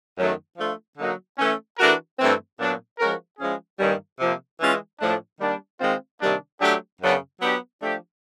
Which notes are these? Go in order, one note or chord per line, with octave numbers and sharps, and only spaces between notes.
F#2 D#3 F#3 A3
F3 A3 D4 F4
D3 F#3 A#3 D#4 F#4
E3 A3 C#4
E3 A3 D4 F#4 A#4
G2 E3 A3 C4
A#2 F#3 B3 D4
F3 G#3 C#4 F#4 A#4
F3 G#3 C#4 E4 G#4
G2 D#3 G3 A#3 C#4
C3 F3 A#3
E3 G#3 C#4 F4
A2 F3 A3 D4
D#3 G3 A#3 D4
D#3 G#3 C4 F4
C3 D#3 G3 A#3 D4
F#3 A3 D4 G4
F#2 C#3 F#3 B3 D4
F#3 B3 D4 G4
F3 A3 D4 G4